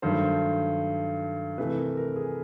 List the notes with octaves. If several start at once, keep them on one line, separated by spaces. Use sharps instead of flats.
G2 D#3 F#3 A3 C5
C3 E3 A3 B4
A#4
A#4
G#4